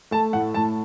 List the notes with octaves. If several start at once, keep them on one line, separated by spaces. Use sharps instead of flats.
A3 A5
A2 F#5
A2 A5